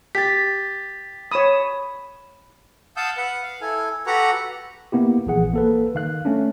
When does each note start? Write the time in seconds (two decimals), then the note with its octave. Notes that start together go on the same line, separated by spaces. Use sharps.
0.15 G4 A6 B6
1.31 C#5 B5 D#6 E7
2.97 F5 F#5 A5 D#6 E6 G6
3.17 B4 F#5
3.43 F5
3.61 E4 A4 G#5
4.06 F#4 G4 A4 B4 F#5 A#5
4.92 A#3 B3 E4 G4
5.26 A#1 E3 G#4 F#5
5.54 A#3 A4 B4
5.95 D#3 F5 F#6
6.25 A3 C#4 D4